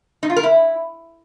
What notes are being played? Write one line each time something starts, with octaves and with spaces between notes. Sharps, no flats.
D#4
F4
A#4
E4